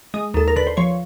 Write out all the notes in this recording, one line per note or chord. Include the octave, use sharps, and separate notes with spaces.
G#3 D#5
D#2 A4
A#4
D3 B4
C5
F3 C#5